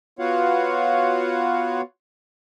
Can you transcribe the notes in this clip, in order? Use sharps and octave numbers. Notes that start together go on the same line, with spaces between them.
B3 F4 F#4 C#5 F5 F#5